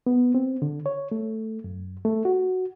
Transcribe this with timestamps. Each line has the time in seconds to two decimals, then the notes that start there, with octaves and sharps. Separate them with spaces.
0.07 B3
0.35 C4
0.62 D3
0.86 C#5
1.12 A3
1.64 F#2
2.05 A3
2.25 F#4